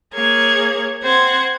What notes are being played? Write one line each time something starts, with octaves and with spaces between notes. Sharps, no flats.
A#3 G#4 C#5 G#6
C4 C5 F#5 G#6